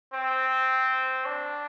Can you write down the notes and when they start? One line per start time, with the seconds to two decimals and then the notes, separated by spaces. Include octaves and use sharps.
0.14 C4
1.25 D4